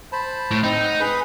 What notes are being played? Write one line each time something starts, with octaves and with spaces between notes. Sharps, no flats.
C5 A5 B5
A2
C4 D#4
F#5
G#4 B4 B5